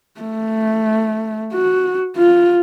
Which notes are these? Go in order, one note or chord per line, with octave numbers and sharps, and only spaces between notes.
A3
F#4
F4